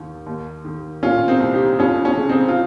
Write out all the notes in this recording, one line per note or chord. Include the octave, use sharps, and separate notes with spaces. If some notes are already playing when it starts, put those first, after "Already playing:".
Already playing: D#2 D#3
D#2
D#3
A#2 C#4 F4
C4 D#4
C2
D#4 G4
F2 C#4 F4
C#4
C#3
C4 D#4
F4